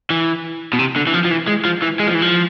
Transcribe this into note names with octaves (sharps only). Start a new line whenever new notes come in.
E3
B2
C3
D3
E3
F3
F3
E3
G#3
F3
E3
G#3
F3
E3
F3